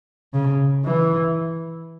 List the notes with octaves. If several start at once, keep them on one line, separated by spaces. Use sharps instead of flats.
C#3
E3